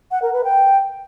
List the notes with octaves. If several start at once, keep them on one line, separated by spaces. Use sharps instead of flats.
F#5
A#4
B4
G5